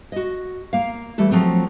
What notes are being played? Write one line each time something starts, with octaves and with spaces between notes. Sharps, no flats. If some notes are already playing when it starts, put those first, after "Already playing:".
F#4 D#5
A#3 F5
E3 G3 A3 A4
F3 F#3 A3 C4